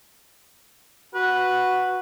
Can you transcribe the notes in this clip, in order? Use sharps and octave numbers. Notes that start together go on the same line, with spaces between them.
F#4 B4